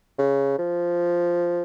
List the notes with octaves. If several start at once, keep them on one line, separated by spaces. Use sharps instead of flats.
C#3
F3